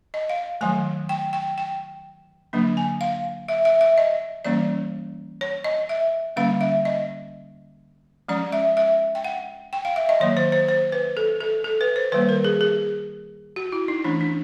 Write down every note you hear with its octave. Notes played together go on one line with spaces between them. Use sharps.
D#5
F5
D#3 F#3 A3 G#5
G5
G5
G5
D3 F#3 A#3 D4
G#5
F5
E5
E5
E5
D#5
E3 G3 A#3 C#4 D5
C#5
D#5
E5
D3 G3 A#3 C#4 F5
E5
D#5
F3 G#3 C#4 D5
E5
E5
G5
F#5
G5
F5
E5
D#5
D#3 F#3 A#3 C#5
C5
C5
C5
B4
A4
A4
A4
B4
C5
D#3 G3 A#3 B4
A#4
G#4
G#4
F#4
E4
D#4
E3 A3 C#4 D4
D4